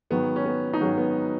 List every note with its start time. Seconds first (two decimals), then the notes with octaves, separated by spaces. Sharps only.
0.10 G#2 D#3 F#3 B3
0.36 C#4
0.46 B3
0.74 D#4
0.80 G#2 D#3 F#3 C#4
0.97 B3